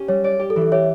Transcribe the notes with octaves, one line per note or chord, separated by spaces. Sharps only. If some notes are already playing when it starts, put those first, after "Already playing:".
Already playing: C#4 G4
G3 C#5
C#5 D5
G4
A4
E3
A4
G4 C#5 E5